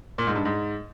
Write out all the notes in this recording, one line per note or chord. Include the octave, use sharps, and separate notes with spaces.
A#2
G#2
G2
G#2